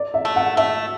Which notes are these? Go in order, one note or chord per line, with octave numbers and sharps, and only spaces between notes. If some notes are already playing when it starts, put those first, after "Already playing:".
Already playing: D5
E5
A3
F#5
A3 E5